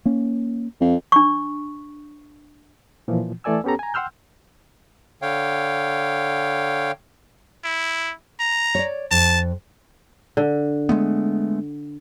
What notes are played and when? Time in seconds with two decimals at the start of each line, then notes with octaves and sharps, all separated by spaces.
0.05 A#3 C#4
0.81 F2
1.12 D4 C#6
3.08 A#2 E3 F3
3.44 E3 A3 A4 D5 G#5 E6
3.64 B3 C#4 G4 A4 A#5
3.79 G#5 A#5
3.94 F#5 G5 C6 E6 F6 G6
5.22 D3 C#5 F5 G5
7.64 E4
8.40 A#5
8.75 C#5 D5
9.11 F2 A5
10.37 D3
10.89 G#3 A3 B3